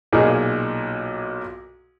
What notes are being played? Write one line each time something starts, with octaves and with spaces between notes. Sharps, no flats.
B1 A#2 A#3 D#4 G#4